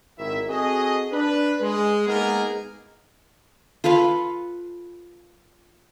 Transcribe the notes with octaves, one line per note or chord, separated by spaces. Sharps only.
G#1 D#3 E4 A#4 E5
C4 F#4 G#4 A4 D#5
D4 B4
G#3
G#3 A#3 B3 D#4 G#4 A#4
F4 A4 B4 F5